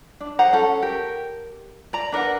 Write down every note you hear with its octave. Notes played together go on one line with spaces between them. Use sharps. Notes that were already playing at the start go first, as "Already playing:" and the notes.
D4
G#4 C5 F#5 A#5
C#4 A4
G4 A#4
D5 A#5
D4 A#4 B4 F#5